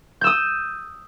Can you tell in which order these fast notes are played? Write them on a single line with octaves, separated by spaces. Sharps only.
G6 E6 D#6